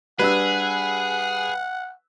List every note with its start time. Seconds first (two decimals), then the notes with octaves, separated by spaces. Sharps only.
0.19 G3 D4 G#4 B4 F#5 E6